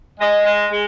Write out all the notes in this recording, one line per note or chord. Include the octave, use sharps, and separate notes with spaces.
G#3 D#5
G#3
G#3